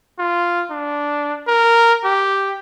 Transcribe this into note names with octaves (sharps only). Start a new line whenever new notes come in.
F4
D4
A#4
G4